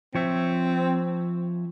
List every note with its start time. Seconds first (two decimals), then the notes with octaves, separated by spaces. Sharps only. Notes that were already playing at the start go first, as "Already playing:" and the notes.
0.15 F3 C4 C#5 E5